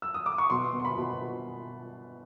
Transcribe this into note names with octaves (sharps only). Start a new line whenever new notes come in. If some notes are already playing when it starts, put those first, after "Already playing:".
E6
D#6
D6
C#6
B2 C6
B2
C6
B5
B2